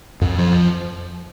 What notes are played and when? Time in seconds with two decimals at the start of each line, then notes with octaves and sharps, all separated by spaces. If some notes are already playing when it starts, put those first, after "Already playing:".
0.21 F2
0.38 F3